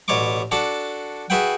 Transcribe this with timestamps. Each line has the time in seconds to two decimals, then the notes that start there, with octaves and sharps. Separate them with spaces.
0.08 A1 B2 C#5 D5 C#6 D6
0.51 D4 F#4 A4 F#5 A5
1.30 F#4 G#4 B4 E5 F#5 G5